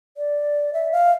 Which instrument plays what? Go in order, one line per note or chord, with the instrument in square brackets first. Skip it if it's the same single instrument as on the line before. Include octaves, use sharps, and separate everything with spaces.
[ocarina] D5
E5
F5